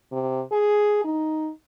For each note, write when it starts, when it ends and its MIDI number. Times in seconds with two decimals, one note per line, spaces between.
0.12 0.42 48
0.52 1.04 68
1.05 1.50 63